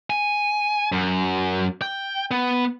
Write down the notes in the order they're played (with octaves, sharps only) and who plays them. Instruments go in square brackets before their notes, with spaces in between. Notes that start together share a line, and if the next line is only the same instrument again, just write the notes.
[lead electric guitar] G#5
F#2
G5
B3